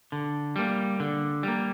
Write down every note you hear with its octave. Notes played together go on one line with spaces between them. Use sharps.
D3
G3 A#3
D3
G3 A#3